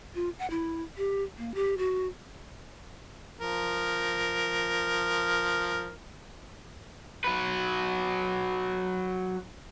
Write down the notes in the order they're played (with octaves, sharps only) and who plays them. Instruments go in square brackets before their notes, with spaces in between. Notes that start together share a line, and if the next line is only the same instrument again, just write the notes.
[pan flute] F4
F#5
E4
G4
A#3
G4
F#4
[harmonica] F3 A#4
[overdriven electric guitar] F#3 B4